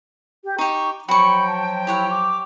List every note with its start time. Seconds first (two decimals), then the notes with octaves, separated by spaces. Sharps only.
0.44 G4
0.58 D#4 G4 C#6
1.08 F3 F#3 F#4 G5 B5 C#6
1.46 A5
1.87 E4 G4 C#5 F#5
2.10 D6